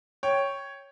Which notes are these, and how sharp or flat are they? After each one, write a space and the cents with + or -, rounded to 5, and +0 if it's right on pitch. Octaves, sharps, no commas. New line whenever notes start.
C#5 +0 G5 +0